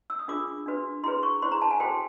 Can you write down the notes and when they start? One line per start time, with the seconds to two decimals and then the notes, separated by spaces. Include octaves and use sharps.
0.10 E6
0.19 D#6
0.28 D4 F4 G#4 D6
0.66 D4 F#4 B4
1.04 E4 G#4 B4 C6
1.23 C#6
1.42 E4 G#4 C5 C6
1.52 A#5
1.62 A5
1.71 G#5
1.80 F#4 A4 C5 G5